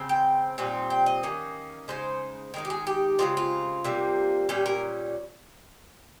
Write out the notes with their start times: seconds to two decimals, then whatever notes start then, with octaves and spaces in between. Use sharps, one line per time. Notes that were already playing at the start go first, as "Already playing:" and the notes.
Already playing: C#3 G#3 C4
0.09 G5
0.58 A#2 G3 C4 D#4
0.90 G5
1.06 D#5
1.23 D#3 A#3 C#4
1.88 C#3 G#3 D#4 C5
2.54 D#3 G#3 D#4 A#4
2.65 G4
2.70 G#4
2.87 G4
3.18 C#3 F3 G#3 C4 F4
3.37 F4
3.84 C3 G3 A#3
4.49 A#2 G3 C#4 G4
4.66 A#4